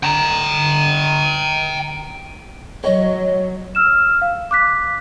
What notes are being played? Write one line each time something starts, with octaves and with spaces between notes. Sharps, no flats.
G5 A#5
F#3 C#5 D#5
E6 F6 E7
F5
D6 F#6 B6